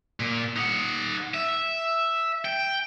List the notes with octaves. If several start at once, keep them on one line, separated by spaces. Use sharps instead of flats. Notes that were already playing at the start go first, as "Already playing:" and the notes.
A#2
D#4 F#5
E5
G5